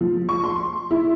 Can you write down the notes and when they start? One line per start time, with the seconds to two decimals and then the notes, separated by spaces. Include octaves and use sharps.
0.01 F3
0.29 C#6
0.44 C6
0.91 E4